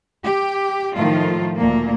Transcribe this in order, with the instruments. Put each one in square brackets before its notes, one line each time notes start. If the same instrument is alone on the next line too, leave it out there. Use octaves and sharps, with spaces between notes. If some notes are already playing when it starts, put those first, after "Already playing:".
[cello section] G4
A2 D#3 F3 A3 F4
D2 A#2 A#3